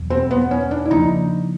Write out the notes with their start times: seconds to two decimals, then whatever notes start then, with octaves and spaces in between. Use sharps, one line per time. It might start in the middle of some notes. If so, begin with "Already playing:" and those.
Already playing: E2 B2 F#3
0.10 C4
0.31 B3
0.51 C#4
0.71 D4
0.85 E4
0.91 C#3 F3 A#3 D4 D#4